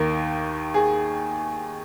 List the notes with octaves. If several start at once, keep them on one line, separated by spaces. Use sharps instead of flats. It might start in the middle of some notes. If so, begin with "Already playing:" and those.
Already playing: D#2 D#3 A#4
G#4